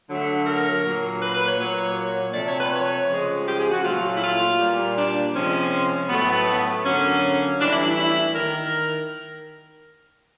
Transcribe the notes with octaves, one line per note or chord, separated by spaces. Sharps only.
D3 F#3 A3
A#4
A#2 F#3 A#3
B4
B4
C#5
A#2 F#3 A#3
C3 F3 A3 D5
C#5
B4
C#5
C#3 F3 G#3
G4
G#4
F#4
A#2 F#3 A3 F4
E4
F4
A#2 G3 A#3
D4
C3 F3 G#3 C#4
A2 F#3 A3 B3
D3 F#3 A#3 C#4
A2 E3 G3 D4
E4
E4
E4
D#3 A#4